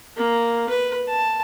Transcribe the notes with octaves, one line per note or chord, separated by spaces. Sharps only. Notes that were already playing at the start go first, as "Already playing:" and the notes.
A#3
B4
A5